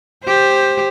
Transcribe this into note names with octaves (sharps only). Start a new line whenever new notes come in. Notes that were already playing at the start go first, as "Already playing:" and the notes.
G4 C5